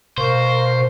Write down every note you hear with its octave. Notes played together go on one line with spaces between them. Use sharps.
B2 A#4 C5 F5 C#6